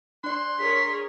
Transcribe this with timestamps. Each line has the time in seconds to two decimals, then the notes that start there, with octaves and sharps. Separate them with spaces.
0.24 D4 D5 C6 F#6
0.59 G#4 A#4 C#5 B6